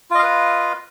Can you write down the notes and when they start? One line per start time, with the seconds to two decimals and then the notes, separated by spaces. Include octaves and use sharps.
0.11 F4
0.15 D#5
0.19 F5
0.23 B4